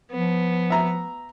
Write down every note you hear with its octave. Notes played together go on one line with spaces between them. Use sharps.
F3 B3
E5 A#5